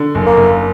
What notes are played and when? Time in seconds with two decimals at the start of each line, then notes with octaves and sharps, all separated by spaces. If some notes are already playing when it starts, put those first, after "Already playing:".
Already playing: D3
0.15 F#1
0.26 A#3
0.37 F#1